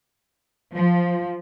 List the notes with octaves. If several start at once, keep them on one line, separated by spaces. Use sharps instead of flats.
F3